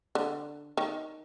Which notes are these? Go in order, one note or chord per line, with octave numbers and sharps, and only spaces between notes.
D3
D#3